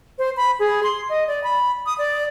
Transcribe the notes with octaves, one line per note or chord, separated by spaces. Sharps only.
C5
B5
G#4
C6
D#5
D5
B5
D#6
D5